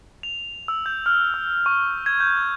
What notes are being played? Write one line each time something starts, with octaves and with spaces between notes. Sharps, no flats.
F7
E6
G6
F6
E6
C#6
G#6
G6